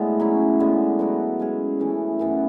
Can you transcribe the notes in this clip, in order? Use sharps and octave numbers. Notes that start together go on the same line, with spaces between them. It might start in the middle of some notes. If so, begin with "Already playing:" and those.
Already playing: A2 G#3 B3 D4
F#3 C#4 E4
D3 G#3 B3
B2 F#3 B3 E4
G#3 C#4 G#4
C#3 E3 A3
F#2 E3 B3